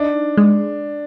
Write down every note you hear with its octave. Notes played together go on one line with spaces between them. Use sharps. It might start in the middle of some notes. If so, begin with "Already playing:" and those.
Already playing: D4 D#4
G#3